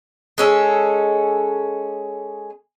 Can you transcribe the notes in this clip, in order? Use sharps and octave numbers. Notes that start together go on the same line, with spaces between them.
G#3 C#4 A4